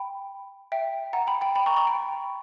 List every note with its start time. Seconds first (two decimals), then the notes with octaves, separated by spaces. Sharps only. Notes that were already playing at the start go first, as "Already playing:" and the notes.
Already playing: G5 B5
0.72 E5 G5
1.13 F#5 A#5
1.27 G5 B5
1.41 G5 B5
1.55 G5 B5
1.66 A#5 C#6
1.76 A#5 C#6
1.87 G5 B5